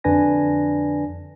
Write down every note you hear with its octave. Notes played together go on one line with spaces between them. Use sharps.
F2 D3 D4 B4 G#5 A#6